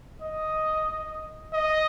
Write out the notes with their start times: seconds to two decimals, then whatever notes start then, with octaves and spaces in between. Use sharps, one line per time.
0.22 D#5
1.54 D#5